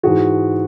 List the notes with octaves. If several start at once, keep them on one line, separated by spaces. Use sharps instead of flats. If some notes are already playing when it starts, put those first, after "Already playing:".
G#2 E3 F#4 G#4